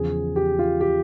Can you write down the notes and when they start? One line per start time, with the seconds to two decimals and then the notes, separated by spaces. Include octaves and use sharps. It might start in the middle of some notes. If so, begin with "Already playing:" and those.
Already playing: E2 C#3 F3 G#4
0.36 G4
0.59 F4
0.81 G4